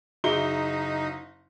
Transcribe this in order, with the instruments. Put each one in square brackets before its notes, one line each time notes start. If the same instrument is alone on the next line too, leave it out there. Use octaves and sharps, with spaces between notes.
[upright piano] F#1 E5 G7 [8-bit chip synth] D#4 [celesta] F#4 G#4